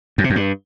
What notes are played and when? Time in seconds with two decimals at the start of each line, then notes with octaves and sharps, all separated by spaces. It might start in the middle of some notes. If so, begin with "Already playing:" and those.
0.18 F#2
0.24 C3
0.30 F#2
0.36 G2